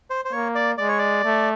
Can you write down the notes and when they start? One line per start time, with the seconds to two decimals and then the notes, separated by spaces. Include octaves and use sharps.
0.10 C5
0.25 C5
0.32 A#3 C#5
0.55 D5
0.78 G#3 D5
0.88 C#5
0.98 D5
1.24 A3